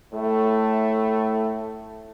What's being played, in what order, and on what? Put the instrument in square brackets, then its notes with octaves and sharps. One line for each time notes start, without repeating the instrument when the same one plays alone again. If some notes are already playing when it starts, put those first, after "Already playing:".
[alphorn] A2 [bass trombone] A3